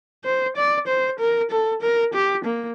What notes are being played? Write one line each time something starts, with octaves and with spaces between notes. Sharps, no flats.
C5
D5
C5
A#4
A4
A#4
G4
A#3